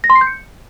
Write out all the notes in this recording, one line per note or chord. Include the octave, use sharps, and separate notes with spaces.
A#6
C6
C7
G6
C#7